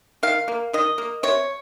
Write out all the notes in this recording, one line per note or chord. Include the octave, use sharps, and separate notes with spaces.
D#3 F5
A#3
D#3 D#5
A#3
C3 C#5